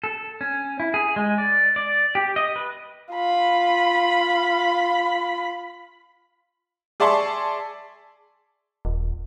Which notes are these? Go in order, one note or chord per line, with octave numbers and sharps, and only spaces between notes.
A4
C#4
E4
G#4
G#3
D5
D5
G4
D#5
B4
F4 B5
G#4 D5 E5 A5 C6 C#6
D#1